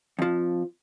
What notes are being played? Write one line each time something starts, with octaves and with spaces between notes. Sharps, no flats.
F2 F3